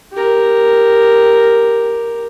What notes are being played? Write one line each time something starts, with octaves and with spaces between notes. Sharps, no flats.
G4 A#4